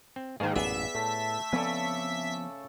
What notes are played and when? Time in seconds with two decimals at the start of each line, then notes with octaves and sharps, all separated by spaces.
0.16 C4
0.40 G#2 D#3 A#3 G#4
0.56 A1 F#2 A#2 B3 G#4 D5 E5 B6
0.95 A2 A3 A5
1.52 C#3 F3 B3 C4 A4 D5 G#5